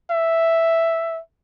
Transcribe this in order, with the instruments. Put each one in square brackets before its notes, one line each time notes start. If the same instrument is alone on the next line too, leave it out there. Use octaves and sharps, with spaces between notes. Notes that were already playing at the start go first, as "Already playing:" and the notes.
[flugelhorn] E5